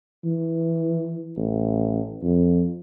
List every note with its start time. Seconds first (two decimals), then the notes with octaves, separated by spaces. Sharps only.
0.25 E3
1.37 A1
2.22 F2